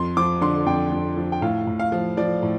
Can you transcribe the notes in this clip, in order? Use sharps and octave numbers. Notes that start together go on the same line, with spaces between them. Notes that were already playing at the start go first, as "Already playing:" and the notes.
Already playing: F2 C6
F3 D6
D3 C6
F2 G5
F2
F3
G5
A2 F5
A2
F5
F3
F3 D5
A2